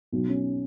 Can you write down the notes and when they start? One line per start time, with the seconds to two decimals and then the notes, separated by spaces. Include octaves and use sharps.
0.12 B1
0.28 C#4